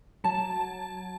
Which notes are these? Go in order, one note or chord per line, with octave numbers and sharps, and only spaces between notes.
F#3 A5